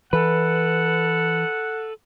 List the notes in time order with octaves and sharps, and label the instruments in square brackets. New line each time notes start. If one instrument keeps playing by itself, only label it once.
[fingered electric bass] E3 [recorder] A4 [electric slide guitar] B4 [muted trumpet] F#5